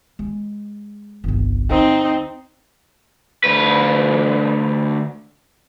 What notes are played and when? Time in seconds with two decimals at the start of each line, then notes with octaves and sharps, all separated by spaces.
0.19 G#3
1.24 G1 C2
1.70 D2 C4 D#4
3.44 D2 B4